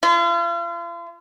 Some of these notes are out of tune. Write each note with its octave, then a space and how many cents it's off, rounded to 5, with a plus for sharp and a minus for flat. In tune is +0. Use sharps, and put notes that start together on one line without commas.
F4 -40